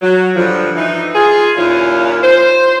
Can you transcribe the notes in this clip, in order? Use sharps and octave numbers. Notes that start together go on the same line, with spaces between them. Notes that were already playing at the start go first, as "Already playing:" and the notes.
F#3
G2 D3 F3
E3 D#4
F4 G#4
D#2 A#2 C#4 E4 F4
C5